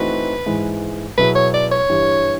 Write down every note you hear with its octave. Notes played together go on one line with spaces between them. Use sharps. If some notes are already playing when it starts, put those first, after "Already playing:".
Already playing: E3 A3 C4 D#4 F#4 B4
G#2 E3 G#3
B2 F#3 B3 E4 G#4 B4
C#5
D5
C#5
G2 E3 G3